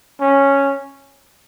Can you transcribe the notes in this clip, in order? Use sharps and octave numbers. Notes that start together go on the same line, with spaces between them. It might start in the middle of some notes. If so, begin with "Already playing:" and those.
C#4